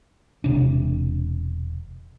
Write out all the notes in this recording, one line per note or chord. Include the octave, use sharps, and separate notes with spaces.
E1 C3 D4